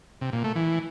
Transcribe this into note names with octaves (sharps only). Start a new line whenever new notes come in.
C3
A#2
A3
E3